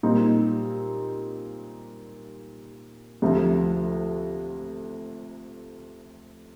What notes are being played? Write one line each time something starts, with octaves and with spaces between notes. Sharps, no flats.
A#2 G3 C4 D#4
D2 C3 F3